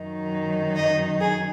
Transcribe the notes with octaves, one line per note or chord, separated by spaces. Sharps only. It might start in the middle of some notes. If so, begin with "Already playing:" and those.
Already playing: F#2 D#3 F#3 D#4
D#5
G#4